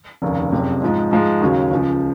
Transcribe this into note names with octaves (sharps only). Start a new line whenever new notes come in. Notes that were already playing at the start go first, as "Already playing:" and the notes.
F1 D#2 C#3
F#1 F2 C3
G#2 F3 G#3
G#2 F3 G#3
D#2 C#3 F#3 C#4
C#2 C#3 F3